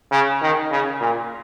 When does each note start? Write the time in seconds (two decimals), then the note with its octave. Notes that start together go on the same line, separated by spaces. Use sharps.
0.12 C#3
0.42 D#3
0.71 C#3
1.01 A#2